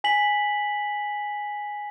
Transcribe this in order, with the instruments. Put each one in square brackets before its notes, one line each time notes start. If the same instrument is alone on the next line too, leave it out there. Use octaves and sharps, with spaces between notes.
[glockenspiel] G#5 B6 F#7